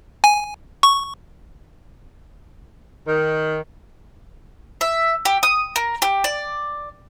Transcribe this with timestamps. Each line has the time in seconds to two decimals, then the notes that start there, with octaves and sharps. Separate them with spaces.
0.24 G#5
0.83 C#6
3.06 D#3
4.81 E5
5.25 G4
5.43 D#6
5.76 A#4
6.02 G4
6.24 D5